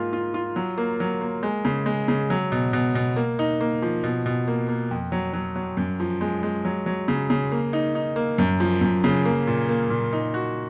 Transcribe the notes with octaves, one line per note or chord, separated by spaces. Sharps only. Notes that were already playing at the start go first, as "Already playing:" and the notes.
Already playing: G#2 G#3 A#3 F4
F4
F4
F#3
A#3
F#3
A#3
G#3
C#3
G#3
C#3
F#3
B2
B2
B2
A#3
D#4
A#3
F3
B2
B2
A#3
A#3
F2
F#3
F#3
F#3
F#2
F3
G#3
G#3
F#3
F#3
C#3
C#3
A#3
D#4
D#4
A#3
F#2
F3
F#2
C#3
A#3
A#2
A#3
A#2
D#4
F#4